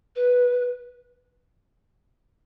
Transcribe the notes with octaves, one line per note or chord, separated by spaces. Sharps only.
B4